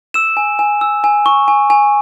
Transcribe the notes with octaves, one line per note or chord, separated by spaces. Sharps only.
E6 E7
G#5
G#5
E6
G#5
C#6
G#5
G#5